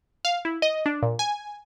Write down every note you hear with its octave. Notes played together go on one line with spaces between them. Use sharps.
F5
E4
D#5
D4
A#2
G#5